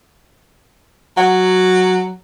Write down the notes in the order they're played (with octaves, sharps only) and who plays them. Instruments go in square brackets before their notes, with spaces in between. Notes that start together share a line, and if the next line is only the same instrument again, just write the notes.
[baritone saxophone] F#3 [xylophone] F#5